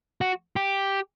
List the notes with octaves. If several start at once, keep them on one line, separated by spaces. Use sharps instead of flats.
F#4
G4